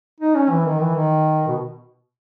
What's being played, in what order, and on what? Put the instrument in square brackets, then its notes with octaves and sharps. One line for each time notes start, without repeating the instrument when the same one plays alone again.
[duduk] D#4
C#4
E3
D#3
E3
D#3
B2